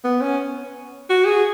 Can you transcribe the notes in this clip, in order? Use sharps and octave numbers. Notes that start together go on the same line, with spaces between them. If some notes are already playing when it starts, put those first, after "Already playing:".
B3
C#4
F#4
G#4